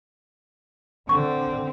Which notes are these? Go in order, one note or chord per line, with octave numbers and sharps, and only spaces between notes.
D3 C4 C#6